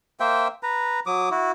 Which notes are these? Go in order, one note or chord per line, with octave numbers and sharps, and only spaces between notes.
A#3 C5 E5 G5
B4 A#5
F#3 D6 D#6
E4 F#4